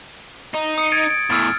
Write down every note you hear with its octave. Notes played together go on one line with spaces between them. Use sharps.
D#4
D#6 C#7
G#6 A6 D7
D7
E2 A2 E6 F6 A6